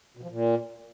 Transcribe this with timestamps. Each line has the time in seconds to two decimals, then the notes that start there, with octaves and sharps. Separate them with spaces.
0.17 B2
0.23 F3
0.29 A#2